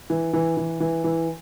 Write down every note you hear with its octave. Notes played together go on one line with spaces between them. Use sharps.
E3
E3
E3
E3
E3